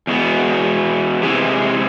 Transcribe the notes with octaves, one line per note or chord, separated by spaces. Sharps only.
E2 B2 G#3 B3
C3 E3 G#3